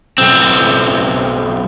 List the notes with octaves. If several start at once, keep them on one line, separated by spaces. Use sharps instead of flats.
B1 C4